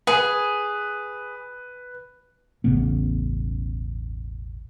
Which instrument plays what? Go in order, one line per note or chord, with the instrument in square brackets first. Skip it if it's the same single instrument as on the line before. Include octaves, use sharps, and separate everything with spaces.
[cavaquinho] G#4 [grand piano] B4
[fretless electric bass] E1 A1 C#3 B3